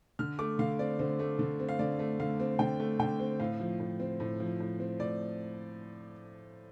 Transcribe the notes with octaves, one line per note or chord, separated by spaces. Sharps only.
D3 F6
A3 D6
D3 F5
C4 D5
D3 C5
A3
D3
C4
F5
D3 D5
A3
D3 F5
C4
D3 G5
A3
D3 G5
C4
A2 F5
F3
A2
C4
A2
F3
A2
C4
A2 D5